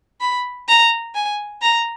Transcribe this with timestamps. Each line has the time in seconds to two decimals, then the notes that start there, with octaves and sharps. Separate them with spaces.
0.21 B5
0.68 A#5
1.15 G#5
1.62 A#5